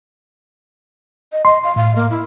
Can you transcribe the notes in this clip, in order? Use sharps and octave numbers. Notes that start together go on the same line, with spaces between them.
D#5
D#5 C6
F5
A2 F5
A#3
E4